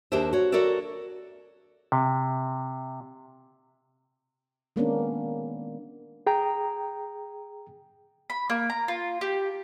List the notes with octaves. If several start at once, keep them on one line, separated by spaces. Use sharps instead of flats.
D#2 D4 G4 A#4 C5 E5
F#4 C#5
F#4 A4 A#4 C#5 D5 E5
C3
D#3 G#3 A#3 B3 C#4 D4
G#4 G5 A#5
B5
A#3
A#5
F4
G4